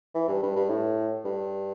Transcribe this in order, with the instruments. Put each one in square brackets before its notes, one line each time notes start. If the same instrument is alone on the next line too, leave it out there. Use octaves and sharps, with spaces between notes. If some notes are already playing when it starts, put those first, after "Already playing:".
[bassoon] E3
G2
G2
G2
A2
G2